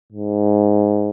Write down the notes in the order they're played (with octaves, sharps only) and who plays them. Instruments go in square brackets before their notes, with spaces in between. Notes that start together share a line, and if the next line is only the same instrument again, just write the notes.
[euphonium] G#2